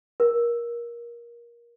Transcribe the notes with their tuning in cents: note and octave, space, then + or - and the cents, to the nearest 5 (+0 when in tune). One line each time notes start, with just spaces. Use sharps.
A#4 +20